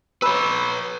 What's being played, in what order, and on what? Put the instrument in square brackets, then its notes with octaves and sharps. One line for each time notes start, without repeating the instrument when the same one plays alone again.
[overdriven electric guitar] B4 C#5 [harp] B5 E6